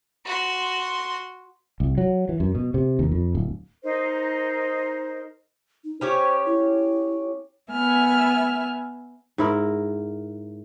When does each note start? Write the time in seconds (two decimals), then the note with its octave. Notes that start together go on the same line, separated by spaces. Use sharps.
0.25 F#4 C6
1.80 C2
1.98 F#3
2.29 E3
2.40 F#2
2.55 B2
2.74 C3
2.99 D#2
3.12 F2
3.35 D1
3.82 D#4 A#4 C5 D#5
5.84 D#4
6.01 C#4 G4 C5 C#5
6.46 E4
7.72 B3 E5 G#5 F6
9.38 G#2 E4 A#4